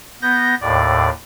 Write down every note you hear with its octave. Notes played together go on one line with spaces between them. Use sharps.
B3 G6 A#6
D#2 A2 D5